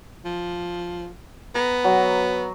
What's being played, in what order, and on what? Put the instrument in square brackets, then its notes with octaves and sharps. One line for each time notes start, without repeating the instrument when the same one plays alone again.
[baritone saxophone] F3
[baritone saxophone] B3 [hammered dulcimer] A#5
[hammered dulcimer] F#3